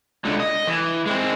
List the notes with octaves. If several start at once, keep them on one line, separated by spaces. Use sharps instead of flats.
C#2 D3
D#5
E3
G#3 C4